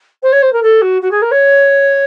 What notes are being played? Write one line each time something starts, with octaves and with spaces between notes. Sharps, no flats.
C5
C#5
C5
A#4
A4
F#4
F#4
G#4
A#4
C#5